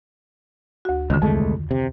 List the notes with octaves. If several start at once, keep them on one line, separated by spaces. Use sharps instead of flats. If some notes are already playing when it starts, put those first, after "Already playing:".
D2 F#4
C#2 D3 D#3
C2 F2 G#3 A3
C3